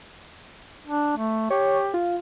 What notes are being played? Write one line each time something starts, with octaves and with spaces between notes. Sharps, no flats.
D4
A3
G4 C#5
F4